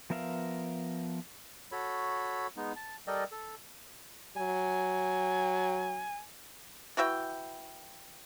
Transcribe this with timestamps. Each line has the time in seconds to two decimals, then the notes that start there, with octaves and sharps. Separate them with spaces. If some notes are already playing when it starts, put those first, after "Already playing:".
0.10 F3 B3 A#4 E5 F5
1.72 F#4 A4 C#5 B5
2.57 G#3 B3 D#4
2.76 A5
3.07 G3 A4 A#4 D5 D#5 G5
3.32 A4
4.37 F#3 G#5
6.97 E3 F#4 E5 G5